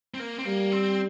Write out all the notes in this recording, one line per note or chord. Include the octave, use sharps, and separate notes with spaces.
C4
A#3
C4
G3 A#3
C4